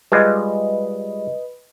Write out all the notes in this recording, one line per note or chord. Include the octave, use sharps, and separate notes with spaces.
G3 G#3 F4 B4 D#5